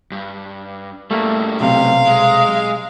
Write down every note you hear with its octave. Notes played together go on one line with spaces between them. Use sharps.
G2
A2 G3 A3 A#3
B1 C3 F5
G#3